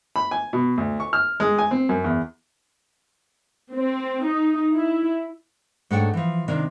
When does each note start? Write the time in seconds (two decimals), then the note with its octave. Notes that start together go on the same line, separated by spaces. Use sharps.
0.16 B5
0.31 G#5
0.53 B2
0.77 D2
1.00 C#6
1.13 F6
1.40 G#3
1.58 G#5
1.71 C4
1.89 F#2
2.04 E2
3.74 C4
4.27 D#4
4.75 E4
5.90 G#2 A3 D4 C#5 F#5 G5
6.14 E3 F3
6.48 C3 D#3 A#3 D4